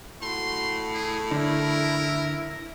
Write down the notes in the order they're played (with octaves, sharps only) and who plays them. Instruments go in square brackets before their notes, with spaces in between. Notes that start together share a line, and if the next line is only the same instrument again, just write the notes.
[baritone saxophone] A2 [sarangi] F#4 [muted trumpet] C6
[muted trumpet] G#4
[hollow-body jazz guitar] D3 [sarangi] E4 [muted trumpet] A#4